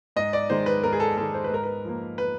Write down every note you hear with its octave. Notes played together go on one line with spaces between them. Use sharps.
G#2 D#5
D5
D#3 G#3 C5
B4
G#2 A#4
G#4
A4
D#3 G#3 A4
C5
B4
G#2 A#4
B4
F3 A#3
B4